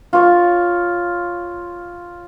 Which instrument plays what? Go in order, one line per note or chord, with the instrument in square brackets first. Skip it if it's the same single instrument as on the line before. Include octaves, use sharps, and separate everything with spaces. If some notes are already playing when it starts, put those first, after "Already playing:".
[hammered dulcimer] F4 C#5